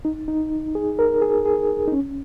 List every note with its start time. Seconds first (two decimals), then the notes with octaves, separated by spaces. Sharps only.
0.05 D#4
0.28 D#4
0.75 G#4
0.99 A#4
1.22 G#4
1.45 G#4
1.87 D#4
1.92 C#4